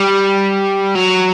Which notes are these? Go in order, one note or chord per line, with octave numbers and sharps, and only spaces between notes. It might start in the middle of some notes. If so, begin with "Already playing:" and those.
Already playing: G3
F#3